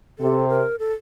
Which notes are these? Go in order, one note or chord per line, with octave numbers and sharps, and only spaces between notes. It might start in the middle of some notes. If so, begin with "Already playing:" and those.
C3 A4
A#4
A4